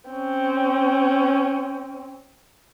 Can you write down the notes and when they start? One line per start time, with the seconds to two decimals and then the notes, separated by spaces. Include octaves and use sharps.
0.10 C4 C#4